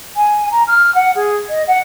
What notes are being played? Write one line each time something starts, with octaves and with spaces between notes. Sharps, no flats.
G#5
A#5
F6
F#5
G#4
D#5
F#5